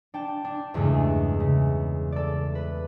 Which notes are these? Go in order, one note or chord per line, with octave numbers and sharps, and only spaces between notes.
D4 G5 A5
D4
E2 G2 C#3 G#3 A3
C#3
A4 D5
B4